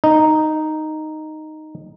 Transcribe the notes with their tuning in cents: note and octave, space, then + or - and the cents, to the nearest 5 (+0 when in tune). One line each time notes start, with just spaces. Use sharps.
D#4 -5